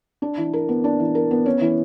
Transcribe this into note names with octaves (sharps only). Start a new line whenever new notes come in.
D4
E3
A#4
B3
D4
E3
A#4
B3
C#4
E3